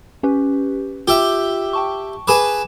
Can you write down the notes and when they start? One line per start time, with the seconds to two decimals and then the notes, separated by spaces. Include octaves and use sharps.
0.23 C#4 G4 B4
1.08 F4 G4 E5
1.73 G5 A5 C#6
2.28 G#4 B4 D6 E7